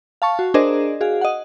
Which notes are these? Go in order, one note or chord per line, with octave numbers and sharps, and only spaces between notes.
F5 A5 C#6
F#4
D4 G#4 A#4 C5 D5 D#5
F#4 G#4 F5
D#5 F#5